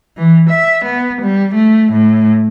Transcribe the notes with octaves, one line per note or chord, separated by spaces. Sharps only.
E3
E5
B3
G3
A3
A2